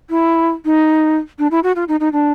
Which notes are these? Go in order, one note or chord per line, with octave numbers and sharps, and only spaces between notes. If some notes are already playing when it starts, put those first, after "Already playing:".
E4
D#4
D4
E4
F#4
F4
D#4
D#4
D4